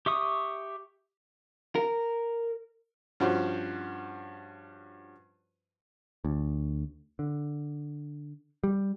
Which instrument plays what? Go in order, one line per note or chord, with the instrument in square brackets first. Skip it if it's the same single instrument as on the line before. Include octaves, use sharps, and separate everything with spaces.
[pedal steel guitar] G4 E5 C#6 D#6
[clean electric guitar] A#4
[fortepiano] G2 F3 C#4 F#4 C5
[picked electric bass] D2
D3
G3